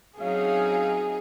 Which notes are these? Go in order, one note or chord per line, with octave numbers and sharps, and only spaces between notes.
F#3 C4 C#4 D#4 G#4 E5 F5